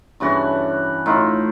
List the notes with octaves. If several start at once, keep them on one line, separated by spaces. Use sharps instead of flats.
G2 C#3 E3 F#4
A2 D#4 F4